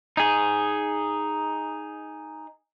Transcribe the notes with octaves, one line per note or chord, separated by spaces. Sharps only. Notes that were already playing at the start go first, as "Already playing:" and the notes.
D#4 G#4